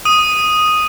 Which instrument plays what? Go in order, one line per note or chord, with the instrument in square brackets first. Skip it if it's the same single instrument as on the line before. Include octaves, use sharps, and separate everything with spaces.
[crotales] D#6 D#7